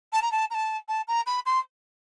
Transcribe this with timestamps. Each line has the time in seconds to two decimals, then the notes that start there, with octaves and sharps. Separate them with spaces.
0.13 A5
0.22 A#5
0.32 A5
0.50 A#5
0.54 A5
0.88 A5
1.08 A#5
1.26 B5
1.46 C6